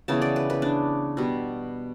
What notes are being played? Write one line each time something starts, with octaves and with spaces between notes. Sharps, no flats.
C#3 E3 B3 A5
D5
B4
B4
D4
B2 G3 B3